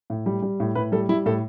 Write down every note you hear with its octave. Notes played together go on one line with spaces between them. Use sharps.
A2
G3
G3
A2
A2 B4
G3 A4
G3 E4
A2 A4